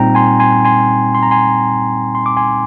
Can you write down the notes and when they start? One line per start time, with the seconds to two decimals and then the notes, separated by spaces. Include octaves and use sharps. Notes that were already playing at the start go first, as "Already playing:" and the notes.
Already playing: A#2 G3 C4 D#4 G5 A#5
0.15 G#5 C6
0.40 G#5 C6
0.65 G#5 C6
1.15 C6
1.23 A#5
1.31 G#5 C6
2.15 C6
2.26 D6
2.37 G#5 C6